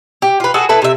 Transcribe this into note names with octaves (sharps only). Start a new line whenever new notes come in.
G4
F4 B4
F#4 G#4 A4
E4 A4 B4
C3 E5